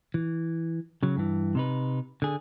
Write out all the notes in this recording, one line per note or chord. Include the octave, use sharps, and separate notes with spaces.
E3
C#3 F#3
G2 E3
C3 D#4 B4
D3 G#4